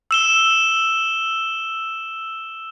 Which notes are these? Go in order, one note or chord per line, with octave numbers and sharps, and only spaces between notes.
E6 E7 G7